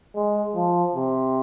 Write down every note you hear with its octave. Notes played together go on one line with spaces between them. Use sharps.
G#3
F3
C3